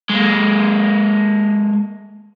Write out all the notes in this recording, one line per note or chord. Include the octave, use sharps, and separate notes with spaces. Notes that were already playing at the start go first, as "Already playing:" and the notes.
G#3 A#3